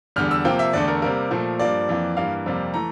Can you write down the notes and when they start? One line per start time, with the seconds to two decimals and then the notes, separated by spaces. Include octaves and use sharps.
0.16 E2 D3 G3 F6
0.31 E6
0.45 C3 F3 A#3 G5
0.59 E5
0.73 E2 D3 A3 D5
0.88 A#4
1.02 C3 G3 A#3 A#4
1.31 A#2 F3 A3
1.59 G2 F3 A#3 D5
1.89 F2 E3 A#3
2.17 G2 E3 A#3 F5
2.46 F2 C3 G3 A#3
2.74 E3 A3 A#5